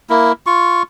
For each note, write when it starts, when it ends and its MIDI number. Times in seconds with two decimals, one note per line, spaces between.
0.10 0.32 58
0.10 0.32 64
0.46 0.83 65
0.46 0.83 85